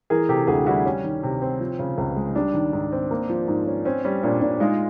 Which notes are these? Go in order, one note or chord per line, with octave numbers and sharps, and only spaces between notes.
E3 G#4 A#4
C3 G4 A4
D2 F#4 G#4
G4
G3 E4 F#4
G3 C#4
D#3
C3
C4
F3
C#3
C#2
G#3
G3 D4
D#3
G#2
C4
A#3
F3
G#2
C#4
C4 C#4
G3 C#4
A#2 D4
A#2 D4
G#3 D#4 F4